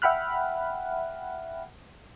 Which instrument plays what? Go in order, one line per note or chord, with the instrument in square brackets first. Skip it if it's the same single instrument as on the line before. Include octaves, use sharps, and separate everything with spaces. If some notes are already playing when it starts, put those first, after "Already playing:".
[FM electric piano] E5 F#5 G5 B5 F6 F#6